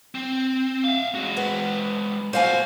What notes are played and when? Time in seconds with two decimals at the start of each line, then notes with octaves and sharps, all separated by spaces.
0.15 C4
0.84 E5 F5
1.15 G#3 F#4
1.37 B3
2.33 A#2 F#4 C5 F5 G#5